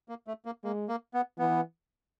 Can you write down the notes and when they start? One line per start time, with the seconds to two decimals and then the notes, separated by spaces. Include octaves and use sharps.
0.09 A#3
0.27 A3
0.45 A#3
0.64 G#3 A#3
0.89 A#3
1.14 B3
1.38 E3 B3